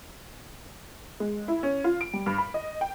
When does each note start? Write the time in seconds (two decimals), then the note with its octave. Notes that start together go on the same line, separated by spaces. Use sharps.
1.20 G#3
1.48 E4
1.63 C#4
1.84 F4
2.01 D7
2.13 G3
2.26 G2
2.38 B5
2.54 D#5
2.81 G5